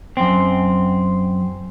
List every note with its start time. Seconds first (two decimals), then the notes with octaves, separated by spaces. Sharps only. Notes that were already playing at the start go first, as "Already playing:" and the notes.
0.17 F#2 C4